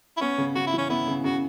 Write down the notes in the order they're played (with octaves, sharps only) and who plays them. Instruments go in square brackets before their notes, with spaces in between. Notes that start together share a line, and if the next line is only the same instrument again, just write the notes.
[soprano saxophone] E4
[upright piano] B3 [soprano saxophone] C#4
[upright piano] C#3
[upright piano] C#3 [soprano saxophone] F#4
[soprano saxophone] E4
[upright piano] E3 [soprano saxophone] C#4
[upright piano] B3 [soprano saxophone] E4
[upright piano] C#3
[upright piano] C#3 [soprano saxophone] F#4